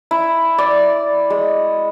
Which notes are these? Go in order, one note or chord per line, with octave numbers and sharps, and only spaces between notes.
E4
D5
G#3